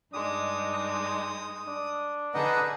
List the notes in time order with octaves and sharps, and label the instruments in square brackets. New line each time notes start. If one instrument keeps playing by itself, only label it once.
[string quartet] G2 G#3 D#4 [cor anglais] D4 [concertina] D#6
[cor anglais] D4
[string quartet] D3 G#4 A4 [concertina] D#4 [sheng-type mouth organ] B4 D#5 F#5